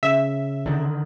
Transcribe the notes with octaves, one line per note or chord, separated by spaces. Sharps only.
C#3 E5
D3 D#3